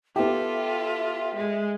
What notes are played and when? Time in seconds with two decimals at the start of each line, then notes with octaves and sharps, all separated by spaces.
0.16 B3 F4 G4 A4 E5
1.35 G#3